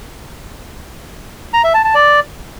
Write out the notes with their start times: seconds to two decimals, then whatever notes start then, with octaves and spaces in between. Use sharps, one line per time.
1.54 A#5
1.64 E5
1.74 A5
1.84 A5
1.95 D5